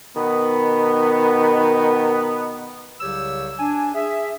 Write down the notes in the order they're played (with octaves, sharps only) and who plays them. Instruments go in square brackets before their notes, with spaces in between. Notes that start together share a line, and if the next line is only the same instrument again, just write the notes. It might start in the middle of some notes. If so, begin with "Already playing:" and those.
[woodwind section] B2 D#3 B3
C2 C#3 F#3 G4 C#5 E6
D4 G#5
G#4 E5